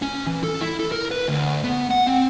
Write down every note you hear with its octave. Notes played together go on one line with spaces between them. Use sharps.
C#4
E3
A4
E4
A4
A#4
B4
D2
B3
F#5
C4